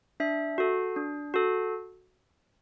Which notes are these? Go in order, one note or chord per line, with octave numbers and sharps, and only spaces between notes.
D4 E5
F#4 A4
D4
F#4 A4